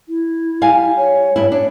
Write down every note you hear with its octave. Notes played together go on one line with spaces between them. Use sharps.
E4
G3 F5 G#5
C#5
G2 E4
D4 C#5